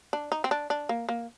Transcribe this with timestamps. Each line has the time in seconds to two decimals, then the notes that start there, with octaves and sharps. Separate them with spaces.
0.13 D4
0.32 D#4
0.44 C4
0.51 D4
0.70 D4
0.89 A#3
1.09 A#3